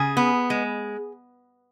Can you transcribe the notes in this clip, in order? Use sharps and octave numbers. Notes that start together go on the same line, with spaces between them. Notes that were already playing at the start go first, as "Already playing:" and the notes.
Already playing: C#3 G#4
B3
G#3